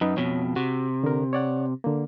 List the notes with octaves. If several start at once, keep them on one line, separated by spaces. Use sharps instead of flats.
F#2 D#4 B4
F2 B2 C#5
C3 F#4
D3 A#4
C#5 D5 F#5
D3 A#3